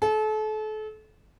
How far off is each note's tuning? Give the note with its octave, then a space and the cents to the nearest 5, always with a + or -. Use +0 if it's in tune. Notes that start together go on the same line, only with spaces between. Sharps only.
A4 -35